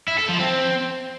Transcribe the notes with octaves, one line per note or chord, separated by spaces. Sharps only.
E4
A4
F3
C4